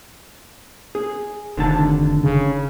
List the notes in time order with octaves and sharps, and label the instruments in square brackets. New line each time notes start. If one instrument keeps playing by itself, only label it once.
[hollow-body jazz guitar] G#4
[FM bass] F1 [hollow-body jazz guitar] D3 D#3 A5
[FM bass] C#3